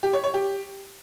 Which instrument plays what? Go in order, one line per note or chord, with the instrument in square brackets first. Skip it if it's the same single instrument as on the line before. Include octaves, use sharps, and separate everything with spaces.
[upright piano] G4
C#5
C#5
G4